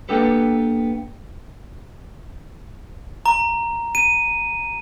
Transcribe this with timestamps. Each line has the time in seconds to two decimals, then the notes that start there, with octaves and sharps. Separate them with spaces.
0.09 A#3 B3 D4 G4 A4 B4
3.26 A#5
3.95 D#7